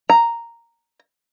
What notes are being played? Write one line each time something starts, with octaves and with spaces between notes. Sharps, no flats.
A#5